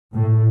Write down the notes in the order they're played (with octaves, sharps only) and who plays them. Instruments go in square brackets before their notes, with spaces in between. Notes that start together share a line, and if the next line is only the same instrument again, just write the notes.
[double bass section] A2